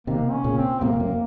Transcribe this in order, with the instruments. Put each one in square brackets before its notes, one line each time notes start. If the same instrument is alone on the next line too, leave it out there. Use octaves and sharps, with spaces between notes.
[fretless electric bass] C3 D#3 [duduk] A#3
[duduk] C#4
[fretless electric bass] A#2 C#3
[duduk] C4
[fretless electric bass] A2 C3 [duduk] A#3
[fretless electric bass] F#2 [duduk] A#3